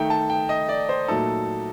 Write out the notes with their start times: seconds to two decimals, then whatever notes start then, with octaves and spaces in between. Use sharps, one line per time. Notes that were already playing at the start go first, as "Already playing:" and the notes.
Already playing: D#3 A3 D#4 G5
0.10 A5
0.30 G5
0.49 D#5
0.69 D5
0.89 C5
1.08 A#2 F#3 A3 D#4 A4